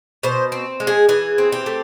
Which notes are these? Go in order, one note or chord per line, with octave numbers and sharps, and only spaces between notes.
B2 C5
C4
G#3
G#4
E3 G#4
C4
G4
A3